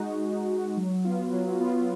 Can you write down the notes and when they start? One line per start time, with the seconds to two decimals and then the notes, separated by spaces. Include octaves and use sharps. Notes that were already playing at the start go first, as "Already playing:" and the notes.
Already playing: G#3 D#4 F#4
0.20 G#3
0.48 D#4 F#4
0.77 F#3
1.04 B3 F4
1.33 F#3
1.60 B3 F4